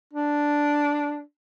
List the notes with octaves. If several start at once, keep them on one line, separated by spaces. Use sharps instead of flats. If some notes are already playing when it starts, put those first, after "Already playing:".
D4